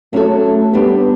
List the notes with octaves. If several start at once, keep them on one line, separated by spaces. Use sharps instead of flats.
F#3 A3 C#4 F#4 A4
G3 B3 D4 G4